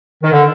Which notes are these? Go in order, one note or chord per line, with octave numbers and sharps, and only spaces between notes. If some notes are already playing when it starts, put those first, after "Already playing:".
D#3
D3